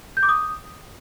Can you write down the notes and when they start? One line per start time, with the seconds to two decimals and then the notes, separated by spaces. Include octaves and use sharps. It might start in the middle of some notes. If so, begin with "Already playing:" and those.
0.17 G6
0.23 D6
0.29 D#6